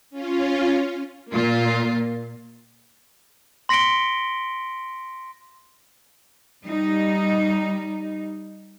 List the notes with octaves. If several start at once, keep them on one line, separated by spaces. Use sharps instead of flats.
C#4 F4
A#2 A#3 F4
C6 A#6 B6 C#7 D7 G7
G3 D#4